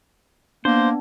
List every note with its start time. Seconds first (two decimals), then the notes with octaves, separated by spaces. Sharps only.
0.65 A#3 B3 D4 C5